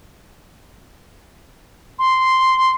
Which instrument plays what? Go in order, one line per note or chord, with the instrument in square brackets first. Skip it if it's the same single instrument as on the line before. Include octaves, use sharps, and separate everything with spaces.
[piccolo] C6